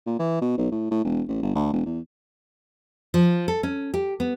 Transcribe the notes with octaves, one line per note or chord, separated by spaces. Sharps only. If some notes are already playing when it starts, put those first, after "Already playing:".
A#2
E3
B2
B1
A2
A2
E1
A1
G1
D2
E1
E2
F3
A4
C#4
G4
B3